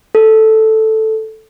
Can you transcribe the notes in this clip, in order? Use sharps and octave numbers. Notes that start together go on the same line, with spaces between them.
A4